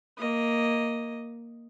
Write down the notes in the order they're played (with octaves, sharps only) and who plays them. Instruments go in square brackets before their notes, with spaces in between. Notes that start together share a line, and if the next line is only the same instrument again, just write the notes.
[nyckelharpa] A#3 D#5